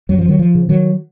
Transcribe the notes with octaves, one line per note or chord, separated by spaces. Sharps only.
F#2 F#3
F3
D#3 F#3
F3
C#3
D#3 F#3